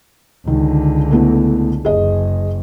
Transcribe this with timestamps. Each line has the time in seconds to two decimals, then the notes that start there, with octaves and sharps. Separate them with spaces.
0.47 C#2 D3 D#3
1.11 A3 B3 E4
1.85 F#1 G#4 D#5